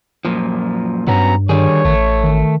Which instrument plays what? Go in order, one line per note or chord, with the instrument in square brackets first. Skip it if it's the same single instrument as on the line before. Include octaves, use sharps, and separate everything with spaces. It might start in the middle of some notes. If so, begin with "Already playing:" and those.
[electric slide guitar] F#2 A#2 F3
[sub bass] G2 [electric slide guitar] F#3 B3 C#4 [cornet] A#5
[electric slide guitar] D3 G3 G#4 [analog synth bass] D#3 [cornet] C#5
[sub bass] A1 [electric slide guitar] A3
[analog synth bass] D#3